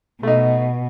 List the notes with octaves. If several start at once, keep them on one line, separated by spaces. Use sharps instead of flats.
B2 A3 D#4